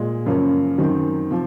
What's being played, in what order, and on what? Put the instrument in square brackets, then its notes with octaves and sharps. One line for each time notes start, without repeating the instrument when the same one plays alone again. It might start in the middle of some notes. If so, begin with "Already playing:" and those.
Already playing: [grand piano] A#2 G#3
F#2 C#3 F3 A#3 C#4
F#2 D#3 F#3 C4
C3 F3